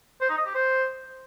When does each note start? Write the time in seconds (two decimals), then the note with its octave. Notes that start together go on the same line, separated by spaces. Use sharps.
0.21 C5
0.30 D#4
0.38 D#5
0.46 G4
0.55 C5